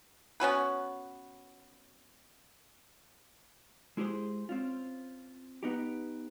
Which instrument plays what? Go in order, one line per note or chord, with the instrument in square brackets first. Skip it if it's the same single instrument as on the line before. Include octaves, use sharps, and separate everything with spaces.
[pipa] B3 C#4 F#4 B4
[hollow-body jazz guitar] G#3 E4 G4 G#4 C5
C4 C#4 F4
B3 D#4 G4